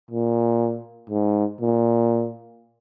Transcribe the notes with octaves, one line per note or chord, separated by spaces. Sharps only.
A#2
G#2
A#2